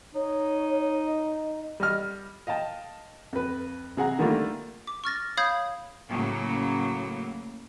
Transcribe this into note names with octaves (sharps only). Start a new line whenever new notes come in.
D#4 C#5
D#5
G3 D#5 F6
D#5 F5 G5 A5
F2 B4
C3 G#4 F#5 A#5
D3 D#3 G3 A3 A#3 F4
D6
C#6 F6 A6 A#6
C#5 F5 B5 D#6 G6 G#6
A2 C#3 F#3 A#3